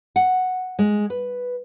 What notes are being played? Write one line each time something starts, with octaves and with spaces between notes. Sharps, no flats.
F#5
G#3
B4